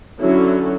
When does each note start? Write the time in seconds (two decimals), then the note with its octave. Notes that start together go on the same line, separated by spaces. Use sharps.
0.21 D3 F#3 C#4 E4